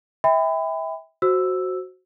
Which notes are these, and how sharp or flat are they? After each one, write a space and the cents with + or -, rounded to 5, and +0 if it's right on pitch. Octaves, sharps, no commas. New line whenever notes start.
E5 -25 G5 +35 B5 +30
F#4 +0 C5 +5 E6 +0